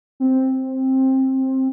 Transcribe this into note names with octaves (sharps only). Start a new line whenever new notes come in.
C4